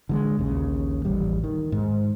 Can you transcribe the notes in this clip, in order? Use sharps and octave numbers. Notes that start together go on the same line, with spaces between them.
D3 F#3 G#3
A#1 D#2 C#3
D1 A1 G3
D#3
G#2